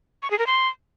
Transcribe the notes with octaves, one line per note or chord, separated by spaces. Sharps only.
C#6
G#4
A#4
C6